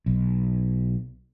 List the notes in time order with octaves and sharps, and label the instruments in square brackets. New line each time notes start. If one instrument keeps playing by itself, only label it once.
[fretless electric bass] B1